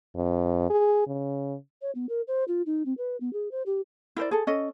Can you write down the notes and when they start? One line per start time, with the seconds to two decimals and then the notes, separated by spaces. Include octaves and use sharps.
0.15 F2
0.70 G#4
1.07 C#3
1.82 C#5
1.95 B3
2.09 A#4
2.27 C5
2.48 F4
2.66 D#4
2.85 C4
2.98 B4
3.20 B3
3.33 G#4
3.51 C5
3.66 G4
4.17 E4 A#4 C5 D5
4.31 G#4 A4
4.47 C#4 A4 D#5